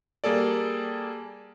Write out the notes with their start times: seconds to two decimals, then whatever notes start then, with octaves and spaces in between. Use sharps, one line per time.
0.24 G3 A#3 G#4 A4 D5